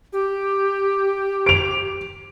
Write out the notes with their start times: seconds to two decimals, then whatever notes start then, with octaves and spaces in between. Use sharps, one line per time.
0.13 G4
1.46 D7 F7